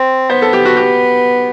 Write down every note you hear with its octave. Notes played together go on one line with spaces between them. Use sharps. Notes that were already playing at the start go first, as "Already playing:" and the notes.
Already playing: C4
B3 C5
A4
G4
F#4
G4